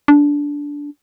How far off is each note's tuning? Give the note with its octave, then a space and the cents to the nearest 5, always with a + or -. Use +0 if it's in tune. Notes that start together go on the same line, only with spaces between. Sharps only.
D4 -15